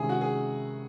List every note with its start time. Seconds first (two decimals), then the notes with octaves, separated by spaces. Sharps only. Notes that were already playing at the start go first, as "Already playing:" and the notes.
Already playing: C3 D#3 G#3 C#4 E4 G#4
0.09 F#4
0.21 G#4